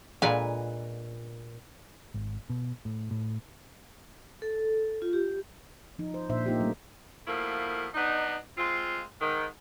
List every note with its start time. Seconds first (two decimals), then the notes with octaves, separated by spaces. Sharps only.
0.22 A#2 D3 G#3 F4 B4 G#5
2.14 G#1
2.50 B2
2.85 A2
3.11 A2
4.42 A4
5.02 F4
5.13 G4
5.99 F3 D#4
6.14 C5
6.29 A#2 D4 C5 E5
6.46 A#3 D4 D#4 F4 G4
6.60 G3 A3 A#3 C#4
7.27 B2 F3 A3 A#3 E4
7.94 B3 D4 D#4
8.58 G#3 C4 F4
9.21 G#2 D#3